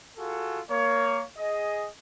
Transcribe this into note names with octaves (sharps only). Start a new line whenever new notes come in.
F4 F#4 G#4 A4
A#3 C#5
G#4 D#5